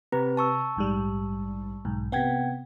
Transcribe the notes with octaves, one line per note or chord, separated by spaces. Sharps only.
C3 C4 G4 B4 A#5
A5 C#6 E6
A#1 G#2 G3
B1 G#2
C3 B3 F#5 G5 G#6